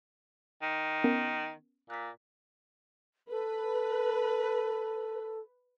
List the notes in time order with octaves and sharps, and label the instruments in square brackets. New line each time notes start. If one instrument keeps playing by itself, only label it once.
[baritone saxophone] D#3
[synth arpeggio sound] B3 C#4 A#4
[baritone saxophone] A#2 [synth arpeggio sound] F#6 B6
[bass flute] A4 [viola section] B4